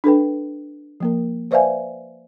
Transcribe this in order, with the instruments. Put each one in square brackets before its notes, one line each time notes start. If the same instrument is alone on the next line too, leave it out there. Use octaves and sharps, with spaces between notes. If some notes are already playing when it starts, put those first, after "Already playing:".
[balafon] D4 A4 B4 G5
F3 A#3 A#4
B4 C5 D5 E5 F5 G#5